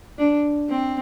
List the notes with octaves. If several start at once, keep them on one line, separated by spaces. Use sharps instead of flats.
D4
C4